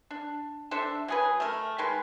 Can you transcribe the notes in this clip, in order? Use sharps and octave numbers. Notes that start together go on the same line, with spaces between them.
D4
D4 A4 C5 E5
F#3 G#4 B4
A3 A#4
D#3 G#3 B4